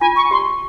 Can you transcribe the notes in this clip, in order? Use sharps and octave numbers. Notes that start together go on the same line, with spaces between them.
F4 G#5
C#6
G4 C6